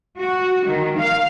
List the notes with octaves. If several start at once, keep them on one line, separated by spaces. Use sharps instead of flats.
F#4
D#3
F5